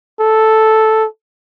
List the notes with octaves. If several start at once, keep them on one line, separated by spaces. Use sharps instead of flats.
A4